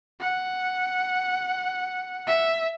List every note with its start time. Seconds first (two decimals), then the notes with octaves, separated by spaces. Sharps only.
0.20 F#5
2.27 E5